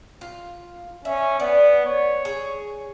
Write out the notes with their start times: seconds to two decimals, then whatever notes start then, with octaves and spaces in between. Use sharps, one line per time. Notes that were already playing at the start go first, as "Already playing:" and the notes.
0.21 F4
1.05 C#4 E5
1.40 B3 D5
1.86 C#5
2.25 G#4